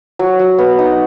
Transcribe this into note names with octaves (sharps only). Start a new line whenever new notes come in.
F#3
F#3
B3
D#4